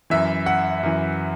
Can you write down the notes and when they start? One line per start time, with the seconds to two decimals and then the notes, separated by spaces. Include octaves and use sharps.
0.10 F#2 E3 E5
0.46 F#5
0.83 F#2 E3